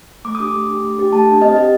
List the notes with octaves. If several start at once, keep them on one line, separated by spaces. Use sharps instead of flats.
A3 D6
D#6
D4 G4 D6
A3
D4 G4
A3
D4 G4
A3 A5
D4 G4
C4 D#5
G4 D#5